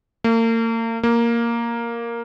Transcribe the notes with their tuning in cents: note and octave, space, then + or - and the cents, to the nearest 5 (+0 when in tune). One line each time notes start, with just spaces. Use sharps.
A#3 -40
A#3 +0